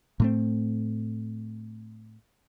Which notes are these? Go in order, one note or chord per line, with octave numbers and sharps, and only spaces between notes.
A2 A3 C4